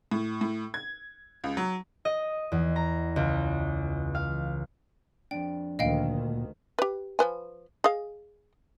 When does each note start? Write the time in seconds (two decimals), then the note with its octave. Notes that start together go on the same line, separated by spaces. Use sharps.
0.11 A2
0.41 A2
0.74 G#6
1.44 C#2
1.57 F#3
2.05 D#5
2.52 E2
2.76 A#5
3.16 C#2
4.15 F5
5.31 F2 G#2 D4 G5
5.79 D2 A#2 D#3 D#5 F5 G5
6.79 G4 B4
7.19 F3 B4 G#5
7.84 G#4 D#5 F5